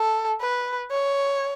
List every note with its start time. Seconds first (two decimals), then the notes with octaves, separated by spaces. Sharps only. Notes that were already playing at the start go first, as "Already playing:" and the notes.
Already playing: A4
0.41 B4
0.91 C#5